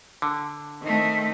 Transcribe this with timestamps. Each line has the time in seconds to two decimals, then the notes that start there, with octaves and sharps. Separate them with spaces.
0.22 D3
0.83 D#3 A3 C4